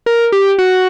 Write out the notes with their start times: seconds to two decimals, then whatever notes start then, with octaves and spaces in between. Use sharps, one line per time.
0.06 A#4
0.32 G4
0.59 F#4